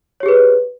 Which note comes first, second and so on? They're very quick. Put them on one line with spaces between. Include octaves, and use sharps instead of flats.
C#5 G4 G#4 B4